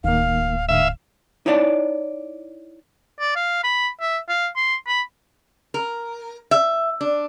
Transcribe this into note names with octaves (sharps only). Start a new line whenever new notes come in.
D1 D#3 A#3 F5
G#2 D3 E5 F5
D#4 E4 C#5 D5 E5 A5
D5
F5
B5
E5
F5
C6
B5
A#4
E5
D4